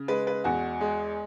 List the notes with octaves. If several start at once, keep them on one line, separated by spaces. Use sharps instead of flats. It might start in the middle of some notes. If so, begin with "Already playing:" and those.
Already playing: C#3
G#3 B4
B4
E2 F#4
G#3